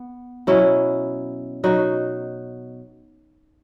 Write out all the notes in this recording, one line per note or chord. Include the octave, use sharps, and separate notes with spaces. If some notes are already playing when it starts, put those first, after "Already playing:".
Already playing: B3
B2 F#3 C#4 E4
B2 F#3 D#4 F#4